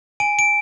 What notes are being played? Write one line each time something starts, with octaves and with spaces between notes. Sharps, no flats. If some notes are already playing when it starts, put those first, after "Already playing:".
G#5 D7
D7